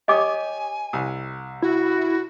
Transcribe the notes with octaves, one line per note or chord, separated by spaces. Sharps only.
G4 C#5 D#5 G#5 D6 D#6
C2
E4 F#4